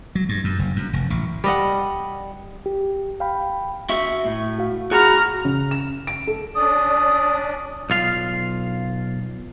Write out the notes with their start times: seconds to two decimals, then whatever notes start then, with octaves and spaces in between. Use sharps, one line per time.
0.15 F#3
0.29 G2
0.44 F#2
0.59 F#1
0.76 F#2
0.93 F1
1.10 A1
1.44 G3 D#5 F#5
2.66 G4
3.20 F5 G5 B5
3.89 F#4 E5 C#6
4.25 A2
4.58 F#4 F5
4.91 F#4 G#4 A#5 B5 F6
5.45 C#3
5.71 E7
6.07 D7
6.27 A4
6.55 C#4 D4 D5 D#6
7.90 B1 F4 F5